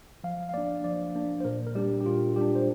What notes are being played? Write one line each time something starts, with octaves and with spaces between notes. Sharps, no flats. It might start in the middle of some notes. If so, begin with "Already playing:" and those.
F3 F5
F5
A#3 D4 D5
F3 D5
A#3 D4
C5
A#2 A#4
A#4
G3 D4 G4
G4
A#2 F4
G3 D4 G4
C5